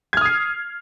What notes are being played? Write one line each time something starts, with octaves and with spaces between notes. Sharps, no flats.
D#6 F6 G#6 C7